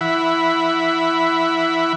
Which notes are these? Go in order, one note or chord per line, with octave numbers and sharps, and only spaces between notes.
E3 E4 F#5 B5